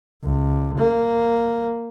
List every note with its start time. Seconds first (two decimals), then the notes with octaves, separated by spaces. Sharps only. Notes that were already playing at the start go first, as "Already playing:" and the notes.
0.23 C#2
0.78 A#3